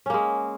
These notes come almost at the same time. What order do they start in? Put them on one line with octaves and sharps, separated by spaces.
C#4 A#3 G#3